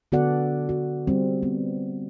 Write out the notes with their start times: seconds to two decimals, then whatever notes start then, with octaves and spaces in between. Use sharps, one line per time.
0.12 D3 B3 F#4 A4 D5 F#5
0.69 F#4
1.07 G3 C4
1.43 B3